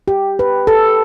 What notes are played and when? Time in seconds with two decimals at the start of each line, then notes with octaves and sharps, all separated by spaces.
0.08 G4
0.39 B4
0.67 A4